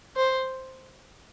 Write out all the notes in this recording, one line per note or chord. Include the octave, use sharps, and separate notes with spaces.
C5